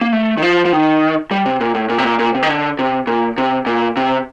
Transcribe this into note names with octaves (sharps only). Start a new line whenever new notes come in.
A#3
A3
D#3
F3
F3
D#3
G3
C3
A#2
A2
A#2
C3
A#2
A#2
C3
D#3
D3
C3
A#2
C3
A#2
C3